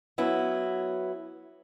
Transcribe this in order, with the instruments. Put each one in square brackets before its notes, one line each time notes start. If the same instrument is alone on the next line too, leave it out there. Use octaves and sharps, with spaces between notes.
[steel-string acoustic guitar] F#3 B3 C#4 E4